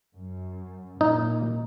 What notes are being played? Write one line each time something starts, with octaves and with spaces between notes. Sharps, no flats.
F#2
A#2 D#4